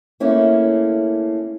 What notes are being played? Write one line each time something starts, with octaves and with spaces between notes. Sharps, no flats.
A3 A#3 C#4 E4